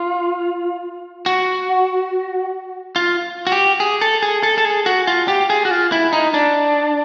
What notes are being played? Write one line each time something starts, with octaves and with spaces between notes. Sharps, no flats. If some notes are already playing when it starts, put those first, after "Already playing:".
Already playing: F4
F#4
F4
F#4
G4
G#4
A4
G#4
A4
A4
G#4
F#4
F4
G4
G#4
F#4
F4
E4
D#4
D4